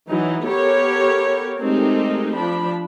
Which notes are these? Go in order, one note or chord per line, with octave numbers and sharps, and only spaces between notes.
E3 F#3 D#4
B3 G4 A4 A#4 C#5
G#3 A3 C4 D#4 G4 A#4
F3 D4 B5